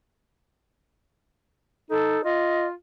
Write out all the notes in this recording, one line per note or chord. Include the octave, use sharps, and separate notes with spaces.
D#4 A4
F4 D#5